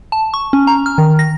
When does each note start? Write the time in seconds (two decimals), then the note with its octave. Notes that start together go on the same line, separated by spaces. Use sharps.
0.12 A5
0.34 C#6
0.53 C#4
0.67 A#5
0.86 F6
0.98 D#3
1.19 A#6